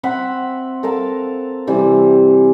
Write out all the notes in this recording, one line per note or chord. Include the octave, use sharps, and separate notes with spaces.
C4 E5 F#5 B5
A4 A#4 F5 A5
C3 E3 G3 C4